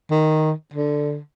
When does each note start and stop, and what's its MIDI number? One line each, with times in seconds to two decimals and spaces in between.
0.11 0.52 51
0.73 1.19 50